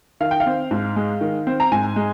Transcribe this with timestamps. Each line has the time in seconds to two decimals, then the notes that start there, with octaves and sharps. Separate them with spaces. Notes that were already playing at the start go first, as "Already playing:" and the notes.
0.20 D#3 F5
0.31 G5
0.40 F5
0.46 C4
0.71 G#2
0.96 G#3
1.21 D#3
1.47 C4
1.60 A#5
1.72 G#2 G#5
1.96 G#3